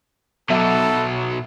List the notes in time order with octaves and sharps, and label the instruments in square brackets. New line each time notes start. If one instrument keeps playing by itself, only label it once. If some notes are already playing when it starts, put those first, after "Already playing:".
[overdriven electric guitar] B2 F#3 [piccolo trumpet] A4 [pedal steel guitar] E5 F#5 D6